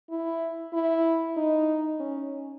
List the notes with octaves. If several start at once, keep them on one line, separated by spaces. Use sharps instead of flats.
E4
E4
D#4
C#4